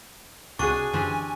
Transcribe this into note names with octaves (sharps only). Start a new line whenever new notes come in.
C#2 C3 D4 F#4 G#4 G#5 C#6 D#7
F#2 D3 E3 C4 D4 G4